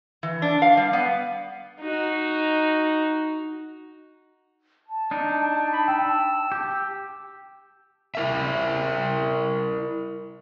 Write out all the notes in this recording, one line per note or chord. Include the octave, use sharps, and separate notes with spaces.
E3
D4
F5
G3
B3
D#4 F#4
A5
D4 D#4
B5
G5 E6
G4
E4 A#4 E5